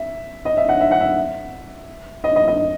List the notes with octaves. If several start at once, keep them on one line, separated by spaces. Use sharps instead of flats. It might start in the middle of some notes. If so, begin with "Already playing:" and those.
Already playing: E5
D#5
E5
F#5
E5
F#5
E5
D#5
D#5
D#5